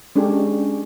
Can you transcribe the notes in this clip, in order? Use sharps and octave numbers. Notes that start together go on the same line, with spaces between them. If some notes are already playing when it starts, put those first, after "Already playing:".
G#3 C#4 D4 G4 A4